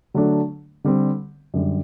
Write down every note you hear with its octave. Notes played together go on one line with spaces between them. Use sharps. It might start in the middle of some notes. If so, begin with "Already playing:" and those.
D3 F#3 A3 D4
D3 G3 C4
F#2 D3 G3